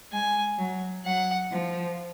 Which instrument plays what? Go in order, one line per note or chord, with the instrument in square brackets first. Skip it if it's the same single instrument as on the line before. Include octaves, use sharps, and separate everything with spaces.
[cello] G#3 [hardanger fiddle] G#5
[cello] F#3
[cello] F#3 [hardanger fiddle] F#5
[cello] F3